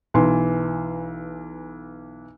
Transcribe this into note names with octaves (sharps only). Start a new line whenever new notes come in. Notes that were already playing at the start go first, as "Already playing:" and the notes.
B1 E3 C6